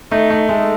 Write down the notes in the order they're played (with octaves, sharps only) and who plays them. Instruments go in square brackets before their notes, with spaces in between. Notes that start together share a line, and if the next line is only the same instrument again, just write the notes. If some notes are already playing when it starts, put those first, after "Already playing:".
[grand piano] A3 [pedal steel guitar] D#4
[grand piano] A3
[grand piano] G#3 [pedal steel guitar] A3